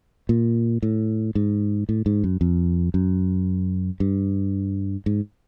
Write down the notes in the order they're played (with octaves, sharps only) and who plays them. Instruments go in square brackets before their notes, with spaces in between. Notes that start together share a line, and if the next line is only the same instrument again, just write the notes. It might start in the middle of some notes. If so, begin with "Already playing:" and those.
[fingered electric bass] A#2
A2
G#2
A2
G#2
F#2
F2
F#2
G2
G#2